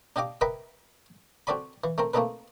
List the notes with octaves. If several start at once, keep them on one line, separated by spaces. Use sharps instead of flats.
D4 G4 D#5 F5 D6
A#4 B4 D#5 E5 G5 B5
C4 F#4 A4 D5 G#5 B5
E3
A3 C4 A#4
A3 A#3 C4 D#4 A4 B4